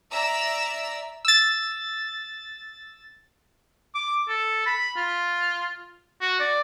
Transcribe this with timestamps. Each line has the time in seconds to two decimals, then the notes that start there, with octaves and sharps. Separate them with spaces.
0.12 D5 E5 A#5 E6
1.25 E6 A6
3.95 D6
4.28 A4
4.66 B5
4.96 F4
6.21 F#4
6.40 D5